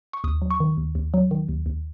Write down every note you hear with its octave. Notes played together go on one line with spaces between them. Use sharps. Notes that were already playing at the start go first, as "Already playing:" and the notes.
C#6
D#2 D#6
F#3
C#6
D#3
D#2
D#2
F#3
D#3
D#2
D#2